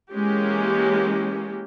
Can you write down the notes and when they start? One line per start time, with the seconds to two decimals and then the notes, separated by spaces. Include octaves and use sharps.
0.12 E3 G#3 A#3 C#4 G4